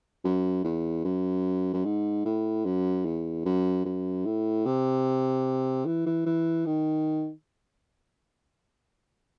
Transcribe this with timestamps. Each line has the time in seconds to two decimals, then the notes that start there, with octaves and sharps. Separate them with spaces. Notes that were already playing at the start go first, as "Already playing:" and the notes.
0.25 F#2
0.64 E2
1.05 F#2
1.74 F#2
1.85 G#2
2.25 A2
2.65 F#2
3.05 E2
3.45 F#2
3.85 F#2
4.26 A2
4.66 C3
5.86 E3
6.06 E3
6.26 E3
6.66 D#3